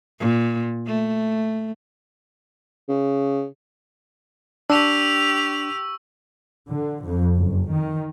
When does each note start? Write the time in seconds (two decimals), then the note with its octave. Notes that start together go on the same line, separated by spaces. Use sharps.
0.20 A#2
0.87 A3
2.89 C#3
4.70 D4 G4 C#6 E6 F7
6.68 D3
7.03 F2
7.35 F#1
7.72 D#3